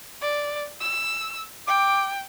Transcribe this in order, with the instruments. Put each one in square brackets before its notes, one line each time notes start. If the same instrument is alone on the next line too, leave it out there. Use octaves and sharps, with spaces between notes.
[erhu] D5
E6
[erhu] G5 [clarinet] D6